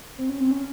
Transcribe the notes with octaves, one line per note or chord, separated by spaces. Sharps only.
C4
C#4
C4
C#4